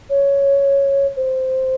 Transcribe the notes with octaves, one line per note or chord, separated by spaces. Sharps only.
C#5
C5